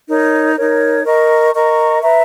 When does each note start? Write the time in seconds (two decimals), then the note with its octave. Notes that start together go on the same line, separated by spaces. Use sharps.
0.08 D#4 A#4 C#5
0.57 D#4 A#4 C#5
1.05 A#4 D#5 A#5 C#6
1.54 A#4 D#5 A#5 C#6
2.03 B4 E5 A#5